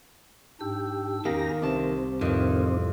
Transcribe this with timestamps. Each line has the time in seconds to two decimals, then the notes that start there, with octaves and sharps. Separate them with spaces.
0.61 G#2 D4 G4 E6
1.25 E2 D#3 A#3 C#4 G4 A#5 A#6
1.62 C2 C4 G4 A5
2.21 F2 A2 D#3